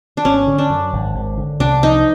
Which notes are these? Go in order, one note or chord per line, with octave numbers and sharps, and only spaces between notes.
D4
G#1 C#4
D3
D4
F#2
G#1
G#1
D3
C2 D4
F3 D#4